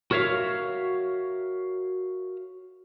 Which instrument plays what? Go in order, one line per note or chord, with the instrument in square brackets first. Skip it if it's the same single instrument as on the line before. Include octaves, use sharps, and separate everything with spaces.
[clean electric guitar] F#4 A#4 C#5 E5 F5